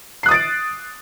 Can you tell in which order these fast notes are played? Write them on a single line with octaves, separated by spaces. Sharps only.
C7 F#6 D#6 A6 D7